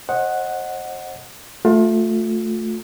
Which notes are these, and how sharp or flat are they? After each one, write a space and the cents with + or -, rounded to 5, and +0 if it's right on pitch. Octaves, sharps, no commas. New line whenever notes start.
C5 +40 D#5 +0 F#5 +0
A3 +0 F4 +30